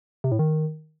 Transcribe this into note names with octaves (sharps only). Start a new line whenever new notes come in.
C3
A2
D#3